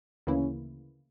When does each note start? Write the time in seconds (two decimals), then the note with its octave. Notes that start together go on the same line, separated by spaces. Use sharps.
0.27 D2 C#3 E3 A#3 C#4 E4